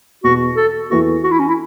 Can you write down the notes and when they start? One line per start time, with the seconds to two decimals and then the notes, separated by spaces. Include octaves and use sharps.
0.24 E2 B2 B3 F#4
0.56 A4
0.90 E2 E3 B3 E4 F#4 A4
1.23 F#4
1.31 E4
1.39 C#4
1.48 E4